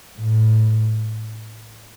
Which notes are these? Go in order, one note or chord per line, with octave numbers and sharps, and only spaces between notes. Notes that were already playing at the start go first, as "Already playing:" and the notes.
A2